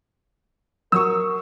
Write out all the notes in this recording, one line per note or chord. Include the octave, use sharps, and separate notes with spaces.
F#3 A#4 C#6 D#6 E6